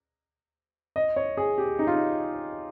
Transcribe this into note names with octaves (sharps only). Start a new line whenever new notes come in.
D#5
C#5
G#4
G4
D#4
F4
D#4